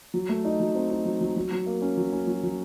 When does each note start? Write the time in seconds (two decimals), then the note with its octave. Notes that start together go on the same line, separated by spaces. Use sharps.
0.14 F#3
0.29 A3
0.45 D#4
0.60 F#3
0.75 C4
0.90 D#4
1.05 F#3
1.21 F#3
1.36 F#3
1.52 F#3
1.66 A#3
1.82 C#4
1.97 F#3
2.13 C#4
2.27 F#3
2.43 F#3